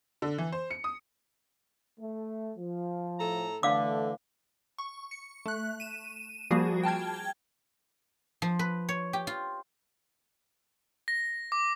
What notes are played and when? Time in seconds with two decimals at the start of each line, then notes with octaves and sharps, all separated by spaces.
0.22 D3
0.38 E3
0.52 C5
0.71 C#7
0.84 D#6
2.00 A3
2.58 F3
3.20 A2 A4 A#5
3.63 D3 E3 A3 F5 D6
4.78 C#6
5.11 C#7
5.46 A3 F#6
5.80 D#7 E7
6.51 F3 G3 A#3 F#4 G#4
6.83 G5 A5 F6 G#6
8.42 F3
8.59 B4
8.89 C#5
9.13 G4
9.27 F4
11.08 A#6
11.52 D6